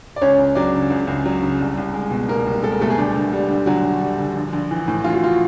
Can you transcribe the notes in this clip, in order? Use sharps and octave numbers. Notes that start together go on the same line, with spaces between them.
D5
C#2 C#4 C#5
C#2
F#3 D4 D5
C#3
C#2
C#2
F#3
C#3
C2
C2
G#3
B2
C2 A#3 A#4
C2
G#3 A4
A#4
B2 A3 A4
G#4
D2 G3 G4
D2
G3
D3
D2 F#3 F#4
D2
G3
D3
A#1
A#1
E3
A2
A#1 F4
F#4
F4